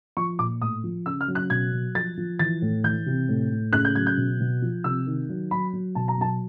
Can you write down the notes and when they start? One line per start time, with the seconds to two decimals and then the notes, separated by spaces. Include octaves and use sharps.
0.17 F3 C#6
0.39 A#2 D6
0.61 A2 D#6
0.84 F3
1.06 C#3 E6
1.21 F6
1.28 F#3
1.35 F#6
1.50 B2 G#6
1.73 F#3
1.95 F3 A6
2.17 F3
2.39 E3 A6
2.62 A2
2.84 E3 G6
3.06 C3
3.29 A2
3.51 A2
3.73 C#3 F#6
3.85 G6
3.95 F#3 G#6
4.07 G6
4.17 B2
4.40 B2
4.62 F3
4.84 C3 E6
5.07 D#3
5.29 F#3
5.51 F#3 B5
5.73 F#3
5.95 B2 A5
6.08 A#5
6.18 F#3 A5